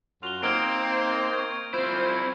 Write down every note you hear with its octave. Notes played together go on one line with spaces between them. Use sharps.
F#2 F4 F#4 F7 G7
A#3 C4 D#4 C5 F6 G#6 D7
C#6 G#6
C4 E4 F4 C5